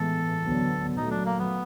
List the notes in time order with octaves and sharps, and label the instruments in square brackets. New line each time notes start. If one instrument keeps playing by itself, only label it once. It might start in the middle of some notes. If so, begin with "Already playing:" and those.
Already playing: [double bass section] A2 E3 G#3 B3 [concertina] A4
[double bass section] D2 D3 F#3 B3
[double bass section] A#2 F#3 A3 [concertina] D#4
[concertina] D4
A#3
B3